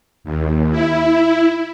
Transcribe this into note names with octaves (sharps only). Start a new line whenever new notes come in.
D#2
E4